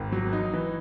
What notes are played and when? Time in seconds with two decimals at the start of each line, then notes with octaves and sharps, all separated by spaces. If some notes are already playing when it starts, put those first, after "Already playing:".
Already playing: G#1
0.12 F#3
0.33 D#4
0.53 E3